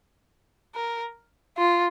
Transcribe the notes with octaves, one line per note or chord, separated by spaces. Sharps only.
A#4
F4